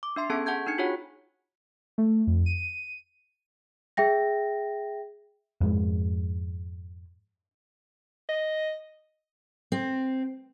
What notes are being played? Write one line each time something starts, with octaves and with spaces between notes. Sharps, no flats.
D6
D4 E5 C6 C7
B3 C#4 G#4 A4 A5 G#6
G#4 F#5 A5 G6 G#6
D4 D#4 G#6 C#7
D4 F4 F#4 G#4 C#5 F#5
A3
F2
D#7
G#4 E5 G5 A#6
F2 G#2 G#3
D#5
C4